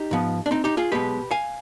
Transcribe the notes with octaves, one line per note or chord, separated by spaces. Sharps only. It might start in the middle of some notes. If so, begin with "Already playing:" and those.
Already playing: D#4 G4
G#2 F3 B3
D4
C4 D#4
D#4 G4
F4 G#4
B1 B2 G#3 B3 G4 B4
F5 G#5